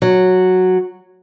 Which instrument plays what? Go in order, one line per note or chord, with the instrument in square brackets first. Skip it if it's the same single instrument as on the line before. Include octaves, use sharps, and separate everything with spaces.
[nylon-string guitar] F#3